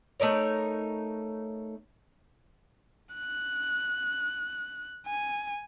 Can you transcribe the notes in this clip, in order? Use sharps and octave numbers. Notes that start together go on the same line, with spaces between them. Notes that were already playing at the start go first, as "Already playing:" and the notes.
A3 D#4 A#4 C#5
F#6
G#5